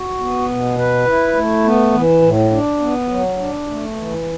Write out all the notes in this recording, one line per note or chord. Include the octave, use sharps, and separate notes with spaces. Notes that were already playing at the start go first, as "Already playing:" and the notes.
Already playing: F#4
B3
B2
B4
E4
A3
B3
E3
A2
D4
B3
F#3
D4
A3
E3